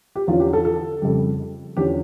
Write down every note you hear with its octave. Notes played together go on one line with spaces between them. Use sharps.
G4
E2 D3 F3 C#4 F4
G4
A4
A4
F2 C#3 G3
E2 D3 F3 C#4 G4